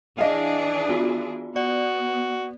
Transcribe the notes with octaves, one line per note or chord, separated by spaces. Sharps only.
E3 D4 G#4 D#5 F5
B3 F4 F#4
B3 F#4 D5